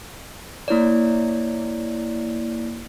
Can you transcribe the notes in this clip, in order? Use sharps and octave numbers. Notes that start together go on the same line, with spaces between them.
A#3 E4 C#5 D5